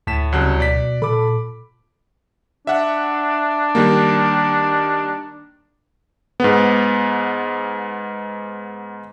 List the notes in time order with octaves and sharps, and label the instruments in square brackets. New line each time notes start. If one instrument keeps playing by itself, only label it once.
[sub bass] D2 [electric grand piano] A2 B6 E7 [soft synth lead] A5
[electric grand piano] C2 F#3 F#6 [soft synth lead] C#3
[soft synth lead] B2 [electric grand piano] D5 B6
[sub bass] A#2 [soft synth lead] A4 [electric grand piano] B5 D6
[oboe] D4 [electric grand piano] E5 F#5
[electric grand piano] D#3 G3 A#3
G#2 B3